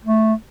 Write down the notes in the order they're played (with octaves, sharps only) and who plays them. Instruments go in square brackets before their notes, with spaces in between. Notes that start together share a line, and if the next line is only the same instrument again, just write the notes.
[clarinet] A3